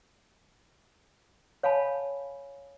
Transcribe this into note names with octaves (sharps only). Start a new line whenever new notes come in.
C#5 F5 G#5 A5 B5